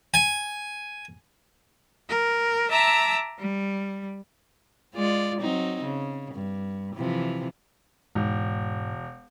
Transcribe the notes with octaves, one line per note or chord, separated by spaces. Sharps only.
G#5
A#4
E5 A5 A#5 D6 E6
G3
G#3 F4 D5
F#3 C4 D#4
C#3
G2
C3 E3 F3
E1 G#2